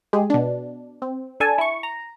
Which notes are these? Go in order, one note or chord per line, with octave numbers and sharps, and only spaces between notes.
G#3 G4 G#4
B2 D4
C4
D4 A4 G#5 A5
E4 C#6
A#5